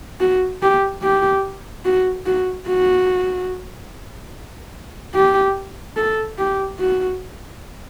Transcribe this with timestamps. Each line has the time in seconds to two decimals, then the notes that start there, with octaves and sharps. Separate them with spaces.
0.20 F#4
0.62 G4
1.02 G4
1.85 F#4
2.26 F#4
2.67 F#4
5.14 G4
5.97 A4
6.38 G4
6.79 F#4